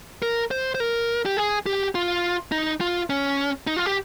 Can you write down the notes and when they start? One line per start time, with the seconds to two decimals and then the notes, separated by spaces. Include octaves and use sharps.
0.22 A#4
0.51 C5
0.75 C5
0.80 A#4
1.26 G4
1.37 G#4
1.66 G4
1.95 F4
2.52 D#4
2.81 F4
3.10 C#4
3.67 D#4
3.77 F4
3.86 G4